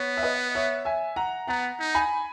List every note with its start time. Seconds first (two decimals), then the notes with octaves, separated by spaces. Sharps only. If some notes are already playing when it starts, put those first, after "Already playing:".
Already playing: B3 C#5
0.17 E5
0.23 B4 D#5
0.55 C#5 E5
0.85 E5 G#5
1.16 F#5 A#5
1.47 B3 F#5 A#5
1.79 D#4
1.95 G#5 B5